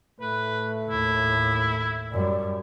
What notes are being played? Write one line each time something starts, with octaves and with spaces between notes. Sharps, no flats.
A2 A3 B4
D#2 A2 E4
F#2 G3 D5